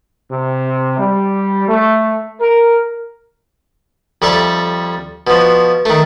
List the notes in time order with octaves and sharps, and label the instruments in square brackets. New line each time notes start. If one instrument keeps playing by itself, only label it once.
[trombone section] C3
G3
A3
A#4
[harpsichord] F2 G3 A4 E5
B2 F3
D#3 A3